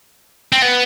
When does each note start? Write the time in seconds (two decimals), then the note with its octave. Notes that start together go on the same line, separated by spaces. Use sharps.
0.52 C4
0.62 B3